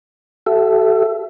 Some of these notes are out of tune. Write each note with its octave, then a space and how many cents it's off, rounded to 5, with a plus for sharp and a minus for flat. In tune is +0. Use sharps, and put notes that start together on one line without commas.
F#4 +45 A4 -10 E5 +20